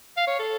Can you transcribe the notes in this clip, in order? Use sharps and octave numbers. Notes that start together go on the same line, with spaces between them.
F5
C#5
A4